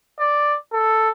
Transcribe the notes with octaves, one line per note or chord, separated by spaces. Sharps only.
D5
A4